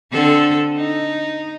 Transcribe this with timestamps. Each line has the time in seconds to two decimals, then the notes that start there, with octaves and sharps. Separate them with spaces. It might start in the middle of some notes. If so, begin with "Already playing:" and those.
0.12 D3 C4 A4
0.77 D#4